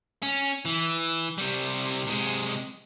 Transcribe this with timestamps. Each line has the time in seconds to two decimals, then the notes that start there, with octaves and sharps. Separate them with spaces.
0.23 C#4
0.65 E3
1.38 C3 G3
2.07 C3 G#3